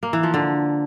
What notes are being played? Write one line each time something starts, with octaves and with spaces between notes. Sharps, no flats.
A#3
E3
F3
D3